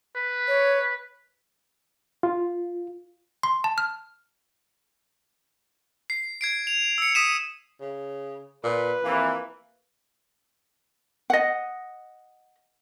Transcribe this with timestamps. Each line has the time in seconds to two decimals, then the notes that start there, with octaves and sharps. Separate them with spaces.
0.16 B4
0.48 C#5
2.23 F4
3.43 C6
3.64 A5
3.78 F6
6.10 C7
6.41 G#6 C7 D7
6.67 F7
6.98 E6 C#7
7.15 D#6 B6 D#7 E7
7.80 C#3
8.63 A#2 B4
9.04 F2 C3 E3 A#3
11.30 D#5 F#5